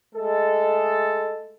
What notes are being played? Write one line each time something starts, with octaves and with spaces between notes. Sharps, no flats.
G#3 A3 A4